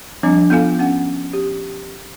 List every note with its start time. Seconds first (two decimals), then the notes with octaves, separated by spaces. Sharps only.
0.23 F3 G3 C4 D4
0.50 B3 F4 A4 F5 G#5
0.79 C#4 F#5
1.33 G4